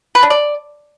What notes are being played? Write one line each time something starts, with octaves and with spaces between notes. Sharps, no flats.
B4
D4
D5